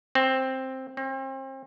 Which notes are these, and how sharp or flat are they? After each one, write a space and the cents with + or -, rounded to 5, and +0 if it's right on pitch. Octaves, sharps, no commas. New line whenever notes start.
C4 +5
C4 +35